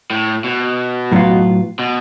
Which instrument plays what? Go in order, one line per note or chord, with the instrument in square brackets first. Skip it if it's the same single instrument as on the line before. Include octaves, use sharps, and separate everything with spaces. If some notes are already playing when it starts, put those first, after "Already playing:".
[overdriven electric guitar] A2
B2
[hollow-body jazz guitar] A2 F#3 B3 F4
[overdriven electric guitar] B2